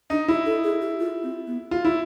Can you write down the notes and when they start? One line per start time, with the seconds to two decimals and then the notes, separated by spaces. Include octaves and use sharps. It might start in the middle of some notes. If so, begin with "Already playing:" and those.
0.10 D4 D#4
0.28 D#4 E4
0.46 A4
0.64 G#4
0.81 G4
1.00 F4
1.23 C4
1.47 B3
1.71 F4
1.85 E4